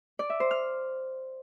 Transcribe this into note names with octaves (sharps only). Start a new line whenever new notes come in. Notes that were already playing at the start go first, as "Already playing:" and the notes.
D5
E5
C5
F6